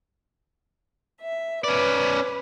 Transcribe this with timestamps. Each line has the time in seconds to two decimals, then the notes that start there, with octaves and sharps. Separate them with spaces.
1.20 E5
1.64 C#4 B4 D5